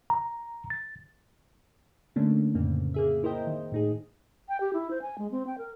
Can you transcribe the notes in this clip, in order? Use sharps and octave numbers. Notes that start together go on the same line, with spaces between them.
A#5
A6
D3 A3 A#3 C#4 D4
F2 A2 C#3 A#3 C4
A#3 G#4 E5
E4 A#4 C5 D#5 G5
D#3
A2 D#4 G#4
G5
G4
E4
C5
G#5
G#3
C4
G5
A#4